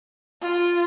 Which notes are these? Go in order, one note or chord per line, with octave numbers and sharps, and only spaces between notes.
F4